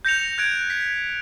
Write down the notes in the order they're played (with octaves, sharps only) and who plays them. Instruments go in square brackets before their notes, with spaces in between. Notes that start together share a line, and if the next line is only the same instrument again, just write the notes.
[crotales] G6 A#6 C#7 F7
F#6 G#6 D7
B6